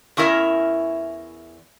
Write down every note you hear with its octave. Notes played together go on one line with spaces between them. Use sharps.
E2 C#4 E4 A#4 E5